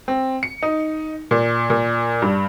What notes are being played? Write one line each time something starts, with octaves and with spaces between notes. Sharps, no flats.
C4
C#7
D#4
A#2
A#2
G2